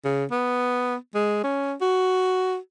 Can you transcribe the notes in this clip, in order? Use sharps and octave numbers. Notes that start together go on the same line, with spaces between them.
C#3
B3
G#3
C#4
F#4